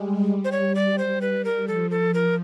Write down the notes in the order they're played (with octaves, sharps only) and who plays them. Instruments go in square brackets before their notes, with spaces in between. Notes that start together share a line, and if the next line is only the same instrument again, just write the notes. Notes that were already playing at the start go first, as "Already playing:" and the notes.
Already playing: [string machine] G3 G#3
G3
[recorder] C5
C#5
D5
C5
B4
A#4
[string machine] F3 [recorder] A4
[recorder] A4
A#4